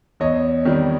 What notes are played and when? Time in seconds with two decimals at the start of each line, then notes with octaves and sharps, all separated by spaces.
0.20 E2 C#5 D#5
0.65 C3 D#3 G3